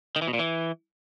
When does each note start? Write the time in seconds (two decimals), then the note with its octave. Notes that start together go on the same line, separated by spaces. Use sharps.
0.16 D#3
0.22 E3
0.28 B2
0.33 A#2
0.39 E3